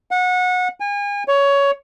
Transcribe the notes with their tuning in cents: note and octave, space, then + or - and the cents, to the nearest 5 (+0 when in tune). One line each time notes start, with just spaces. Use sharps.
F#5 -25
G#5 -35
C#5 +15